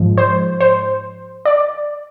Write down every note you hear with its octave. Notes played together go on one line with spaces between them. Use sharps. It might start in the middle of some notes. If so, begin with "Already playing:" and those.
Already playing: G#2 F3 G#3
C5
C5
D5